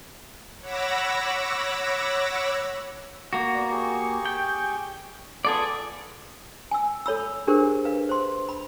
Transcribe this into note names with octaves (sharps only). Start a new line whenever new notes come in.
C#5 F#5 B5 D6 E6 A#6
A#3 F#4
B3 D5 A#5
G4 G#4 C#6
G5
B3 F4 G#4 A4 D5 B5
G#5 E6
A4 C#5 B5 E6
D4 G4 G#4 A#4 C5
B4 F5
C5 C6
B5